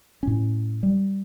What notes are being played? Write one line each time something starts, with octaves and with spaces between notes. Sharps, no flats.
A2 C#4
G3